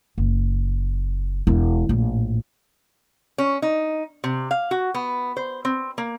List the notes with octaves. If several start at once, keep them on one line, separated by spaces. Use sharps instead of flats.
F#1
E1 E4
A#1 A2
C#4
D#4
C3
F5
F#4
B3
C5
C4
A#3